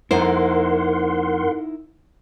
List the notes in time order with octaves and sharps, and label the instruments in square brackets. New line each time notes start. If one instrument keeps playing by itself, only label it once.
[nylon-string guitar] F2 A#3 C5 [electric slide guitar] D#4 E4 [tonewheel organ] A#4 F#5 C6